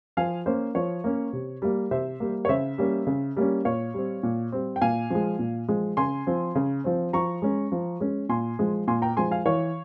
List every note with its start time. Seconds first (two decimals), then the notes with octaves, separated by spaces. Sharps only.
0.17 F3 F5 G#5
0.46 A#3 C#4 C5
0.75 F3 C#5
1.04 A#3 C#4
1.33 C3
1.62 G3 A#3
1.91 C3 C5 E5
2.20 G3 A#3
2.45 C#5
2.49 C#3 C5 E5
2.78 G3 A#3 C#4
3.07 C#3
3.37 G3 A#3 C#4
3.65 A#2 C#5 F5
3.94 G3 C4
4.23 A#2
4.52 G3 C4
4.76 G5
4.81 A#2 F5 G#5
5.10 F3 G#3
5.39 A#2
5.68 F3 G#3
5.97 C#3 G#5 C6
6.27 F3 C4
6.55 C#3
6.84 F3 C4
7.13 F3 A#5 C#6
7.42 G#3 C#4
7.72 F3
8.00 G#3 C#4
8.29 A#2 G#5 C6
8.59 F3 G#3
8.87 A#2 G#5 C6
9.02 G5 A#5
9.17 F3 G#3 G#5 C6
9.31 F5 G#5
9.46 E3 C#5 F5